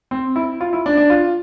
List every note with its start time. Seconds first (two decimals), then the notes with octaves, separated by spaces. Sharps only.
0.11 C4
0.36 E4
0.61 F4
0.73 E4
0.86 D4
0.97 D4
1.10 F4